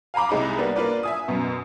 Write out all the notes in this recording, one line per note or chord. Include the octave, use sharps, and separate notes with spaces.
F5 G#5 A#5 B5 D6
C2 G#3 D#4 B5
G3 A#3 B3 D4
A#3 D4 F4 B4 D5
E5 G#5 D#6
F#2 B2